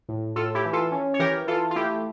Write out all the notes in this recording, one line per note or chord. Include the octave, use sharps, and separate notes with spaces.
A2
A2 F4 A4
E4 G4
E3
F4 A4
C#4
C#5
E3 G4 A#4
E3 F4 A4
F4
A3 E4 G4